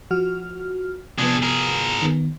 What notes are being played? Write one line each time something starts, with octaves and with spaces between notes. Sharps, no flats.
F3 F#4 F6
C3 F3 B3 D4 G#4
G#4 A#4
D#3 B3